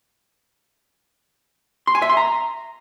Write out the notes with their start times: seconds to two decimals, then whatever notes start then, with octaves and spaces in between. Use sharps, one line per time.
1.87 C6
1.95 G#5
2.02 E5
2.10 C6
2.17 A#5